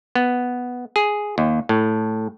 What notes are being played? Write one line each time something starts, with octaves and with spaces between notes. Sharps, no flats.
B3
G#4
D#2
A2